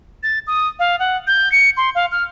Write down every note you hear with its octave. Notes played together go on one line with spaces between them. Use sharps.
A6
D#6
F5
F#5
G6
C#7
C6
F5
F6